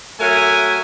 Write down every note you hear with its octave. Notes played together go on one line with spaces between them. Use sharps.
F#3 A3 A#4 E5 G#5